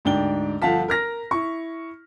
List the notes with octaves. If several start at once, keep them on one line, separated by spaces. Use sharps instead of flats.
D2 G#2 D4 G5 G7
G1 F3 F5 F#5 A5 B6
A#4 F6 A#6
E4 C#6